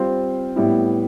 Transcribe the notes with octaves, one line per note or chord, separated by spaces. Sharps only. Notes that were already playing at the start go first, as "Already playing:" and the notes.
Already playing: G3 C4 F4 C5
A2 G3 B3 E4